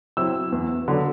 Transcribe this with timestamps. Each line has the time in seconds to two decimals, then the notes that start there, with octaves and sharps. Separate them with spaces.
0.17 F#3 C4 E4 E6
0.52 E2
0.88 D3 F#3 B3 D4